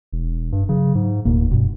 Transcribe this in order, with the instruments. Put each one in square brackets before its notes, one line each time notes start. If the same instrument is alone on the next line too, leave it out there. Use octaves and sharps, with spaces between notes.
[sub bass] E1
G2
[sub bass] C#3 [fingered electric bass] F#3
[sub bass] G#2
[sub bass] F1 [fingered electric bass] D#2 A#2 A#3
[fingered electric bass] G2 B2